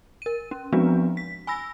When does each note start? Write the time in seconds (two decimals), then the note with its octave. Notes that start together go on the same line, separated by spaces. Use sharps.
0.22 A#4 D#7
0.51 C#4
0.73 F3 G#3 B3 C4 D4 F#4
1.17 B6
1.47 G#5 B5 E6 A#6